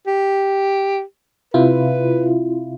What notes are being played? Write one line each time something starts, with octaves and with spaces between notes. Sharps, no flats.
G4
C3 E4 F4 B4